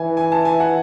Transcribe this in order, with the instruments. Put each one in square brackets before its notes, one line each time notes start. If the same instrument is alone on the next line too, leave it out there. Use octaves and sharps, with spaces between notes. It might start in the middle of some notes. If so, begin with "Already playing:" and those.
Already playing: [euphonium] E3 [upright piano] G#5
[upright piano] G#5
A5
G#5
F#5